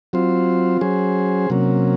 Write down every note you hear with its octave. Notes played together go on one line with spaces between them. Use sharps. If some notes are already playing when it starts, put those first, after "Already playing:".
F#3 C4 F4 C5
F#3 C#4 G#4 C5
C3 F#3 A#3 C#4